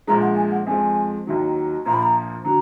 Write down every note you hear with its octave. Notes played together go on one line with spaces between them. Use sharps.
A#1 A#2 F3 G#3 A#5
F#5
G#5
F#5
F2 F3 G#3 G#5
D#2 D#3 F#3
A#1 A#2 F3 A#3 A#5
B5
A#5
D3 F#3 A#5